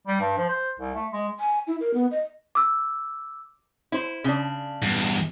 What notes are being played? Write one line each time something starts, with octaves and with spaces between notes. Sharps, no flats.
G3
G2
F3
C5
C2
A3
G#3
G#5
E4
A#4
B3
D#5
D6 E6
E4 C5
C#3 D4
E2 G2